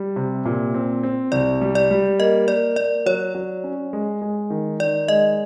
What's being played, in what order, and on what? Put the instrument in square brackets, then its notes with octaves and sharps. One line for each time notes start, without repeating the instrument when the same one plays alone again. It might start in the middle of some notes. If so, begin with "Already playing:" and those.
Already playing: [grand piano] G3
C3
A#2
C4
C4
[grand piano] C2 [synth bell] D5
[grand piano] G3
[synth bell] D5
[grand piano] G3
[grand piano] A#3 [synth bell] D#5
[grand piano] A#3 [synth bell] D5
[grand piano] A#3 [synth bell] D5
[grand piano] F#3 [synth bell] C#5
[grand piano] F#3
C#4
G#3
G#3
D#3
[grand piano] D#3 [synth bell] D5
[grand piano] G#3 [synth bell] D#5